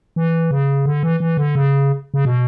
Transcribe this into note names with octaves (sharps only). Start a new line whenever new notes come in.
E3
C#3
D3
E3
E3
D3
C#3
C#3
B2